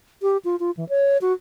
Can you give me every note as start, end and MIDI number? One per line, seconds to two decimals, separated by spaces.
0.22 0.37 67
0.45 0.56 65
0.60 0.71 65
0.77 0.88 52
0.89 1.18 73
1.21 1.33 66